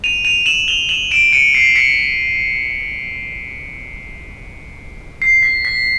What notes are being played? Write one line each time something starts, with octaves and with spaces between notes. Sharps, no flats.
D#7 F7
D#7 F7
E7 F#7
F7 G7
E7 F#7
D7 E7
C#7 D#7
C7 D7
B6 C#7
C7
B6
B6